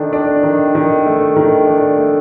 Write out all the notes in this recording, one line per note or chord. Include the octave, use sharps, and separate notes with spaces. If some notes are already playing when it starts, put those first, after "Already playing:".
Already playing: D#3 A3 D4
D4
D#3
D#3
A3
D#3
D4
A3